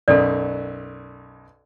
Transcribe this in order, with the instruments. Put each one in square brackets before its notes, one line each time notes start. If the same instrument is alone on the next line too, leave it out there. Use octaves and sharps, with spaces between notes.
[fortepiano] B1 F#2 [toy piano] A4 D5